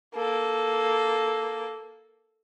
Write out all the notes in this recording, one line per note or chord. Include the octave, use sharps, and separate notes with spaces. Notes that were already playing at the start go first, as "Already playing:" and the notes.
A#3 A4